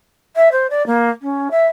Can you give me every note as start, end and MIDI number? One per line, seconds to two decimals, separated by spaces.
0.36 0.49 76
0.52 0.67 72
0.70 0.85 74
0.86 1.10 58
1.22 1.48 61
1.51 1.67 76